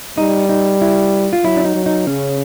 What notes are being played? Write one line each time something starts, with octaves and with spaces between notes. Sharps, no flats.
G3 D#4
D#4
E4
F4
F#3 E4
D4
D#4
F#3
D#4
C#3 C#4